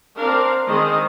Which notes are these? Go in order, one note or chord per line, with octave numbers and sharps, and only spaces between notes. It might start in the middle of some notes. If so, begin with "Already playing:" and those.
C4 D4 A#4 F5
D#3 G#3 C4 D#5